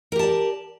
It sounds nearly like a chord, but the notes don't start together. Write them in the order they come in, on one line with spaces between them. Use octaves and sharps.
A#4 G4 A5 D5